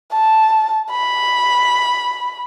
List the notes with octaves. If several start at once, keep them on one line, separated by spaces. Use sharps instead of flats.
A5
B5